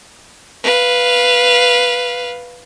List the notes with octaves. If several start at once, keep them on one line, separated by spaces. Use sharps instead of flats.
B4 F5